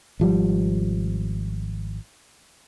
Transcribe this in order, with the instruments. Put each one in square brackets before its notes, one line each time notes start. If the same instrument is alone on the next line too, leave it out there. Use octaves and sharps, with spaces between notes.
[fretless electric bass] G#1 F3 G3